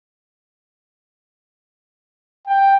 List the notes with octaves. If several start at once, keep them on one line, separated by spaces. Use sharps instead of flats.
G5